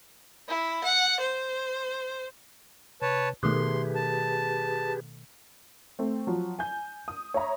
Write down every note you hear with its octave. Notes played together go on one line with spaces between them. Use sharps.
E4
F#5
C5
C3 B4 C#5 A5
B2 D#3 A3 G4 G#4 B4 C6
A5
A3 C4
F3 F#3
G#5 G6
D#6
C#5 E5 A#5 B5